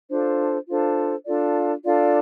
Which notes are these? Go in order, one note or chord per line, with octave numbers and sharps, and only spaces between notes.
D4 F4 A4 C5
D4 F4 A4 C5
D4 F4 A4 D5
D4 F4 A4 D5